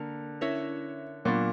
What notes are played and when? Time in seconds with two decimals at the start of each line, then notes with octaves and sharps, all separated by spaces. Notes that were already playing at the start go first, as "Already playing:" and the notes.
Already playing: D3 A#3 A#4
0.41 C#4 E4 A#4 C#5 E5
1.25 A#2 F#3 B3 D4